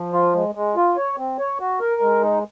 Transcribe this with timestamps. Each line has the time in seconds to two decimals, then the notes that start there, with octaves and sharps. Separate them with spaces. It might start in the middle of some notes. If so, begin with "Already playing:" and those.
Already playing: F3
0.13 F4
0.35 G#3
0.55 G#3
0.76 F4
0.97 C#5
1.18 C4
1.39 C#5
1.60 F#4
1.80 A#4
2.01 G#3
2.22 D#4